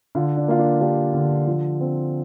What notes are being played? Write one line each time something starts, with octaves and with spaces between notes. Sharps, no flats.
D3 F4
D4
A#3 F4
D4
A#3 D4 G4
D3
F3
C4